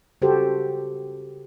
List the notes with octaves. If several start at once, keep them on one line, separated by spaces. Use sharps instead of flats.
C#3 F#4 G4 A4 C5